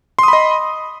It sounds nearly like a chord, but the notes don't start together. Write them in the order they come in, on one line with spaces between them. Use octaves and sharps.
C6 D#6 B5 D#5